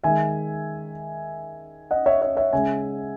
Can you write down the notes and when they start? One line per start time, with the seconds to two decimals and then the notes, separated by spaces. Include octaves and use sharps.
0.04 D#3 G#3 E5 G#5
1.91 D#5 F#5
2.06 C#5 E5
2.22 C#5 E5
2.37 C#5 E5
2.52 C#3 G#3 E5 G#5